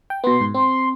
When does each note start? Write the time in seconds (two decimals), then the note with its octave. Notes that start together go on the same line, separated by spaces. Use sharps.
0.10 G5
0.24 B2 B3 C6
0.41 G#2
0.54 C4 C6